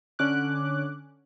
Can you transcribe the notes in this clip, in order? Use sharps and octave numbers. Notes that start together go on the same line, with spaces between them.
D3 C#4 D6 F#6